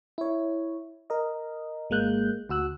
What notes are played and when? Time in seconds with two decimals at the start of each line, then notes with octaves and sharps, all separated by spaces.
0.18 E4 C#5
1.10 A#4 D#5
1.90 G#1 G#3 A#3 F#6 G6
2.49 D2 F#4 E6 F#6